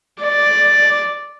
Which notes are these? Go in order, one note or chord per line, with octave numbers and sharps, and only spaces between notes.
D5